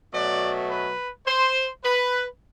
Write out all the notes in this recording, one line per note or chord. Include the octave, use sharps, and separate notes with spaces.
B2 F#3 A3 D5
B4
C5
B4